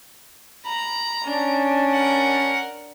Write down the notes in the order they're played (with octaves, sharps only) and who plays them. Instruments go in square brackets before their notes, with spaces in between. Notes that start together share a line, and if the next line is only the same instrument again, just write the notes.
[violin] A#5 [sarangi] B5
[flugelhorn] C#4 [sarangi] D4
[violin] A#4 F#5